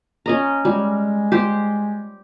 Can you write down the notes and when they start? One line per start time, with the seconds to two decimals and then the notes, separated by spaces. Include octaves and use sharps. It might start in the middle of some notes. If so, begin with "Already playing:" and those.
0.26 C#4 D#5 A#5
0.65 G3 G#3
1.32 G4 C5